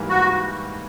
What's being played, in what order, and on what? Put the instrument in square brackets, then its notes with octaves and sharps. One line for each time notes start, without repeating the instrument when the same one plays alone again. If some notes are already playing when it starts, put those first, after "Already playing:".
Already playing: [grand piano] G#2 E3 G3 A#3
[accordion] F#4